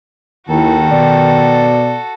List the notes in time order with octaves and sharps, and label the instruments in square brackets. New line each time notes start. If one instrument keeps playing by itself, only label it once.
[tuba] D#2 [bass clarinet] D#3 [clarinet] E4 [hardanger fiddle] F#4 A4
[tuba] B2 [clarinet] D5